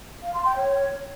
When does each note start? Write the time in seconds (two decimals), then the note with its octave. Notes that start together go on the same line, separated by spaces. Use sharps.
0.22 F5
0.34 C6
0.45 G5
0.56 C#5